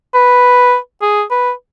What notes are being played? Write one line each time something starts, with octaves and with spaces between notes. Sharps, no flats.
B4
G#4
B4